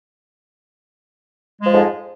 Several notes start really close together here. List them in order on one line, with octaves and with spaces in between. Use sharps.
G#3 F3 G#2 F2